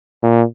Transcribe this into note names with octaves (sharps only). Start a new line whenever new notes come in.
A#2